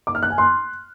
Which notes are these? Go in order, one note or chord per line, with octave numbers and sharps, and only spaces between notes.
D6
F6
F#6
G#5
C6